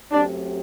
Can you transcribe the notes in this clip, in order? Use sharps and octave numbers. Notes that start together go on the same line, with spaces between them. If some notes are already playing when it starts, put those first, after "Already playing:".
F#2 F#3 A3 C4 D4 G4